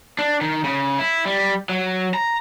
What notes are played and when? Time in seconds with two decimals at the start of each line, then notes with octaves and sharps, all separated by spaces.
0.19 D4
0.41 D#3
0.64 C#3
0.99 E4
1.25 G3
1.69 F#3
2.14 A#5